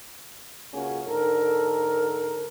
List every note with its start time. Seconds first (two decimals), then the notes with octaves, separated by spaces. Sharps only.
0.73 C#2 A#3 C#4 F#4 G#4
1.07 G#2 D3 A4 A#4